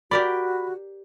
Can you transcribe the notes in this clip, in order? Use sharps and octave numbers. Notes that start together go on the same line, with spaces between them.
F#4 G4 A#4 D5 B5